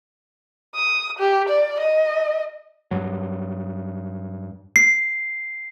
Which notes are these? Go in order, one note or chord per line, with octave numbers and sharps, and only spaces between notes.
D#6
G4
D5
D#5
G2 F#3
C7